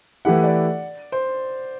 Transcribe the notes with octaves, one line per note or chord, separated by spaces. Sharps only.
E3 A3 E4 G4 F#5
D5
C5